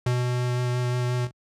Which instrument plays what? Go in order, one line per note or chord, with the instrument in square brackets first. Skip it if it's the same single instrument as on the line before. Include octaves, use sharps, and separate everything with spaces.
[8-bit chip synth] B2